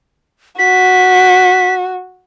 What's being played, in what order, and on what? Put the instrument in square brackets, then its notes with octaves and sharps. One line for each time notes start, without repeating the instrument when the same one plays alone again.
[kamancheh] F#4 [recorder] B6